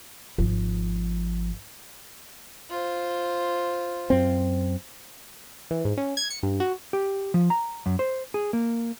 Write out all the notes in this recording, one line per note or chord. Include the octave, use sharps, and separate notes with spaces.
G#1 F3
F4 C5
F#2 C4
E3
G#2
C#4
G#6
C#7
G2
F#4
G4
F3
A#5
F#2
C5
G#4
A#3